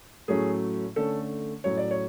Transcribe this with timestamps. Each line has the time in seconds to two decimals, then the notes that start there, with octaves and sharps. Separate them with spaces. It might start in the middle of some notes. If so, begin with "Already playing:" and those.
0.28 A2 F#3 A3 C#4 G#4
0.96 D3 A3 C#4 A4
1.64 A2 F#3 C#4 C#5
1.77 D5
1.91 C#5